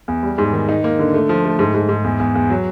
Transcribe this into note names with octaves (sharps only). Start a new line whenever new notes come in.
E2
G3
G#2
D#3
D#4
A#3
D3
A3
F3
A3
G#2
G#2
G#2
E2
E2
E2
F#3